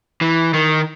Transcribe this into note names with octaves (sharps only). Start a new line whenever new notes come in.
E3
D#3